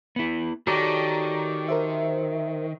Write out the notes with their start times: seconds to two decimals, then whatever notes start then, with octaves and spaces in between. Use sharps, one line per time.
0.16 B3 E4
0.67 D#3 F#4 G4 A4 C#5 D5 A#5
1.69 A#4 C5 E5